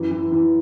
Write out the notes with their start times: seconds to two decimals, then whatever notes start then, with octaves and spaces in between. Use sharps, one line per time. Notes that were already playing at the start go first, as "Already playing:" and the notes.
Already playing: F#2 E3
0.11 E3
0.32 E3